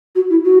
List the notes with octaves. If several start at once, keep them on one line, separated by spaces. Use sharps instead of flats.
F#4
E4
F#4